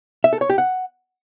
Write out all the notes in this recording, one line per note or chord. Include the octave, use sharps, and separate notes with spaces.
E5
A4
C#5
G4
F#5